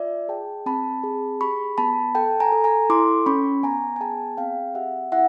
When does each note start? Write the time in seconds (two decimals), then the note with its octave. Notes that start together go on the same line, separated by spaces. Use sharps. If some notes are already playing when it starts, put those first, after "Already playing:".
Already playing: F4 D5 E5
0.29 G#4 G5 A5
0.66 C4 A5 B5
1.03 G#4
1.41 G4 B5 C#6
1.78 B3 A5 B5
2.15 A4 G5 A5
2.40 G#5 A#5
2.52 A4
2.64 G#5 A#5
2.90 E4 C6 D6
3.26 C#4 B5 C#6
3.63 B3 G#5 A#5
3.96 G#5
4.01 G#4 G5 A5
4.37 C4 F5 G5
4.75 G4 E5 F#5
5.12 E4 E5 F#5